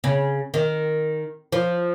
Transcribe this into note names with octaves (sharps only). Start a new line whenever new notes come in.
C#3
D#3
F3